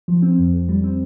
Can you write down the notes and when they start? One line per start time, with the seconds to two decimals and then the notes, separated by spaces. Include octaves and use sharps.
0.08 F3
0.22 C4
0.39 F2
0.53 F2
0.69 G3
0.84 C4